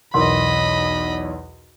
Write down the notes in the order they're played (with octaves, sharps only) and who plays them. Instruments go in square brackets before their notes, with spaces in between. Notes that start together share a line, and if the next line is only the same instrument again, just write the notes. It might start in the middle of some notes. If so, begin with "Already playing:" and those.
[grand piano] B1 E2 [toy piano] A#4 C6 [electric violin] D#5 B5